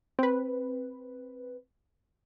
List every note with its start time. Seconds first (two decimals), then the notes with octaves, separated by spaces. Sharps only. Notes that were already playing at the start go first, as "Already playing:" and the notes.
0.19 C4 B4